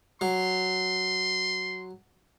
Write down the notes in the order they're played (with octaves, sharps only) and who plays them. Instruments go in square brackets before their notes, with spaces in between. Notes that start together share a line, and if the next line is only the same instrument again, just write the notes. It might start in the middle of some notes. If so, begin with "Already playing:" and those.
[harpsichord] F#3 [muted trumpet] C6